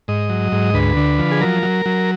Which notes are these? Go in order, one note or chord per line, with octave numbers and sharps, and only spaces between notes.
G#2 D#5
F#3
G#2
D2 B4
D3
F3
G#4
F#3 A#4
F#3
F#3